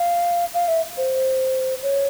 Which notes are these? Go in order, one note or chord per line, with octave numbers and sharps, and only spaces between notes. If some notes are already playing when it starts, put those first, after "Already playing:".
Already playing: F5
F5
E5
C5
C#5